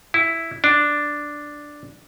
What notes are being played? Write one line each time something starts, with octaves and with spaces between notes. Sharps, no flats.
E4
D4